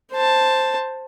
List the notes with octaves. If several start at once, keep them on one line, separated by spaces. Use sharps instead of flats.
C5 A5